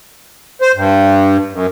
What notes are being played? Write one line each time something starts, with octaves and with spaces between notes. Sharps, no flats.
C5
G2
F#2